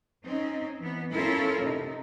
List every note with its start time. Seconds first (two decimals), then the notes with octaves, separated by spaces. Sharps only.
0.24 C4 C#4 D#4
0.80 E3 B3
1.13 C#4 E4 F4 A4 A#4
1.60 C3 D#4